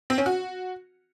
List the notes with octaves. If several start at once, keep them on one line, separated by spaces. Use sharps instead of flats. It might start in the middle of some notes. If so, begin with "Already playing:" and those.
C4
C#4
F#4